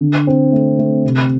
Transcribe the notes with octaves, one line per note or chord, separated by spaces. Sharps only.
D3
C4
A3
A3
C3